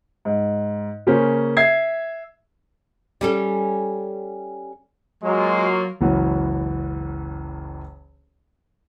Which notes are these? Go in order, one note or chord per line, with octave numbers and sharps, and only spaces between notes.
G#2
C#3 A#3 C#4 C5
E5 G#6 C7
G3 C#4 A4
F#3 G#3 A#3 F4 F#4
F#1 C#2 E3 F#4 C#5